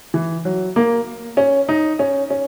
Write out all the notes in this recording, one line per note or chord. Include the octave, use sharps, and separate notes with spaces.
E3
F#3
A#3
C#4
D#4
C#4
C#4